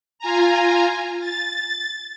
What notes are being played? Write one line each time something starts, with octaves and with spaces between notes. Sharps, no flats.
F4 G#5 A#5
A6